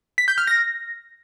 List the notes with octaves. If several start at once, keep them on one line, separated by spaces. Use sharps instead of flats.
B6
G6
F6
A#6